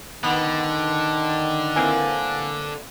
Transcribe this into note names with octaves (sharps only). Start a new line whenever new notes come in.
D3 D#3 B3 B6
E3 A#3 C4 F5 G#5